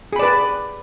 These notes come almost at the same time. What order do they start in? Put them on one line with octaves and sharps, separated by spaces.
G#4 B5 D5 B4